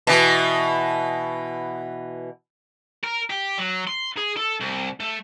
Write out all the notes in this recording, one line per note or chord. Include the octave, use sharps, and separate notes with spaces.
B2 E3
A#4
G4
F#3
C6
G#4
A4
C2
A3